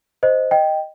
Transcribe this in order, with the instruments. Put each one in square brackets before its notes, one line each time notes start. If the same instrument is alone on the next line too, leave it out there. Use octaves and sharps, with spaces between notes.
[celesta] C5 D#5
D#5 G5